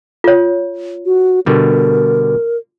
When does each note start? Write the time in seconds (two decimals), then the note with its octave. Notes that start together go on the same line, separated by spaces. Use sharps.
0.24 F4 C#5
1.06 F#4
1.46 B2 D3 G3 A#4